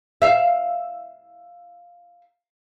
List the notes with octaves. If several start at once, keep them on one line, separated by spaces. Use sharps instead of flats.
E5 F5